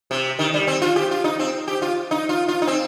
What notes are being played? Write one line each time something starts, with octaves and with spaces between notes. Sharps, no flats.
C3
D#3
G3
C4
F4
G4
F4
D#4
C4
G4
F4
D#4
F4
F4
D#4
C4